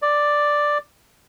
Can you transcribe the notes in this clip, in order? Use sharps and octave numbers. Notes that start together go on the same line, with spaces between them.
D5